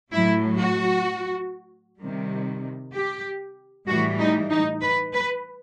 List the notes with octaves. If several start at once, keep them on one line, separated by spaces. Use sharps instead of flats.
A2 F#3 E4
F#4
C3 D#3 G3
G4
A2 E3 G3 F#4
D#4
D#4
B4
B4